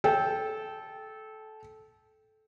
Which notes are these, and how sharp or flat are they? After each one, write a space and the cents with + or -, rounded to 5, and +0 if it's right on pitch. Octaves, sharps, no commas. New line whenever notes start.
A4 -20 G5 +0